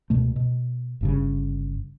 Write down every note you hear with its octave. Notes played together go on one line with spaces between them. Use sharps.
C#2 B2 A3
B2
G1 G2 C#3